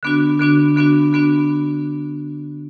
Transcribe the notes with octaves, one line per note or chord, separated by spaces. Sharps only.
D3 B3 D4 F#4
D3 B3 D4 F#4
D3 B3 D4 F#4
D3 B3 D4 F#4